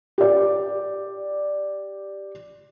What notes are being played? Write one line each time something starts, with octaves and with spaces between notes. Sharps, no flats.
G4 D5